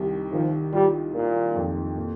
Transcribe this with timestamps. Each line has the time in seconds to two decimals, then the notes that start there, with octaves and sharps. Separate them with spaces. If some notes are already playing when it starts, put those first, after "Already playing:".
Already playing: C2 C3 D#3
0.32 D#3 F3
0.73 G3 F4
1.14 A#2 A#3
1.55 F2
1.96 A#2